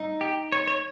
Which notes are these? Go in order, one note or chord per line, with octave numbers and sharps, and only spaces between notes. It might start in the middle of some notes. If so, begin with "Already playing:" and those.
Already playing: D#4
G4
C#5
C#5